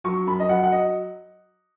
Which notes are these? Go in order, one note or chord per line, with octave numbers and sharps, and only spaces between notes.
F#3 C#6
F#2 B5
D#5
F#3 F#5
F#5
D#5